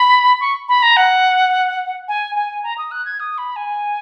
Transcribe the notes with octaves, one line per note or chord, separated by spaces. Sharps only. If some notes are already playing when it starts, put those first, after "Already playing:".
Already playing: B5
C#6
B5
A#5
F#5
G#5
G#5
A#5
D#6
F#6
G#6
D#6
B5
G#5